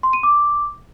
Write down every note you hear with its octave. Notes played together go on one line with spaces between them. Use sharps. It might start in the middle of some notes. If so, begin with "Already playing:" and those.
C6
D#7
D6